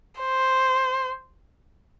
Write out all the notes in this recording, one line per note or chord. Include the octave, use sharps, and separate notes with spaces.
C5